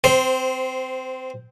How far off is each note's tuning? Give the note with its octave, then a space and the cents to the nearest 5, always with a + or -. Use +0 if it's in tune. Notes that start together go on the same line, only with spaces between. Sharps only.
C4 -20 C5 +0